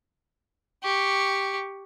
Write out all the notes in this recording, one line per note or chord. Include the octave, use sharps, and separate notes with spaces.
G4 C#6